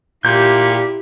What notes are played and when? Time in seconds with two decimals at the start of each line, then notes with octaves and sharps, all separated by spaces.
0.25 A#2 E4 G4 G6